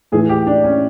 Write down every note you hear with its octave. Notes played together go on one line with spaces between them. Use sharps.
A2 E3 G#4
G4
D4
C#4